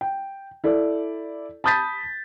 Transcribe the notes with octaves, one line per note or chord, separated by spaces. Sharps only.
G5
E4 A4 D5
A5 B5 D#6 G6 A6 B6